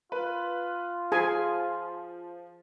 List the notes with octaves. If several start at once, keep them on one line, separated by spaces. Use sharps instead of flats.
F4 B4
F3 G#4 G#5